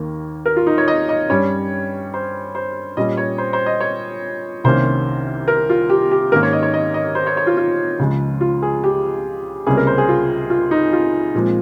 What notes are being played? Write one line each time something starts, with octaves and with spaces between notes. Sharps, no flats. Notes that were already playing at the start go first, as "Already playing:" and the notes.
Already playing: D#2 D#3 A#3
A#4
F4
D#4
C#5
D#5
D#5
G2 G3 C#4 C#5
C5
C5
A#2 G3 C#4 D#5
C#5
C5
C5
D#5
C#5
C2 C3 D#3 A#3 C#4 C5
A#4
F4
G4
G4
G#2 D#3 A#3 C#4 A#4
C#5
D#5
C#5
D#5
D#5
C5
C#5
C#5
F4
F4
C#2 C#3 F3 G#3
F4
G#4
G4
C#2 C3 G3 A#3 C#4 G#4
A#4
C5
G#4
F4
F4
D#4
F4
A#2 F3 G#3 C4